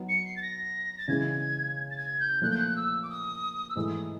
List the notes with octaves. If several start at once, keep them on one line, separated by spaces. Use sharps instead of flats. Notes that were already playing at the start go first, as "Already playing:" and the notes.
Already playing: F#3 B3 D#4 F#4
C#7
C7
A6
A#6
A6
C#3 E3 G#3 C#4 G#6
A6
G#6
G6
A#2 F3 A3 F#6
G6
F#6
E6
D6
D#6
E6
G#2 E3 A3 D#6